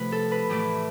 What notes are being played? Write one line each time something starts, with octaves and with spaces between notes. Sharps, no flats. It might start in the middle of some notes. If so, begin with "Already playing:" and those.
Already playing: C3 F3 A3 F4 B4
A4
B4
A2 E3 A3 D5